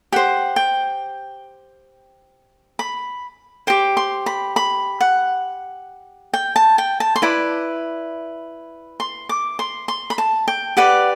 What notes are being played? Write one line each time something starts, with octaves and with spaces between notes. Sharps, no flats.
G4 C5 F#5
G5
B5
G4 C5 G5
C6
B5
B5
F#5
G5
A5
G5
A5
C6
E4 B4 D5 B5
C6
D6
C6
C6
B5
A5
G5
G4 B4 D5 F#5